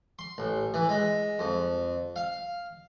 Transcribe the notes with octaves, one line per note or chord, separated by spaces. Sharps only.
C6
A1
E3
G#3
F2
F5